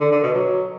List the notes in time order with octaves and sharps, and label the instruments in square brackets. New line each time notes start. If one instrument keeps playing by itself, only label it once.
[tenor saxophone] D3
D3
B2
F#3